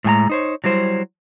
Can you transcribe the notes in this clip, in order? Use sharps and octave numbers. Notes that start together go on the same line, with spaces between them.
A2 G#3 G#5 A#5
D#4 C5 C#5
F#3 G3 E4 C5